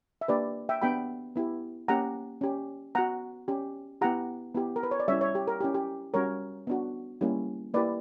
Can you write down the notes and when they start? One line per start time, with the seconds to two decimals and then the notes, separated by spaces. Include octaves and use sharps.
0.21 E5
0.28 A#3 D4 G4 B4 D5
0.69 E5 G5
0.82 B3 D4 G4 G5 B5
1.36 B3 E4 G4
1.88 A#3 C#4 G4 F#5 A#5
2.41 C#4 G4
2.95 B3 F#4 F#5 A#5
3.48 C#4 G4
4.01 B3 E4 G4 F#5 A#5
4.55 B3 E4 G4
4.76 A#4
4.83 B4
4.91 C#5
5.00 D5
5.08 G3 C#4 E4 C#5 E5
5.21 C#5 E5
5.35 G4
5.47 A#4
5.61 C#4 E4 G4
5.74 G4
6.14 G3 C#4 F#4 A#4 C#5
6.67 B3 D4 F#4
7.21 G3 A#3 C#4 E4 G4
7.74 A#3 E4 G4 B4 D5